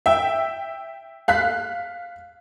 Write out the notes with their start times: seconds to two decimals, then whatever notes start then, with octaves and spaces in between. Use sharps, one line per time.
0.06 E5 G5
1.28 F5 F#6 B6